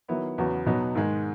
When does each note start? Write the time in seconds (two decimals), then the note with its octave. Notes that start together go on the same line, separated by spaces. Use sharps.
0.08 D#3 F#3 B3 E4
0.38 E2 C#3 F#3 B3 F#4
0.66 B2 F#3 B3 D#4
0.95 G#2 D#3 G#3